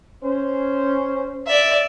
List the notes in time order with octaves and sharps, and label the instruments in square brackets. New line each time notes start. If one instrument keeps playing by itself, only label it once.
[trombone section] C#4 C5
[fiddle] D5 E5